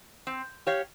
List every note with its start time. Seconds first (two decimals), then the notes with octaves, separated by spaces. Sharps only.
0.27 C4
0.67 G4 C#5 F5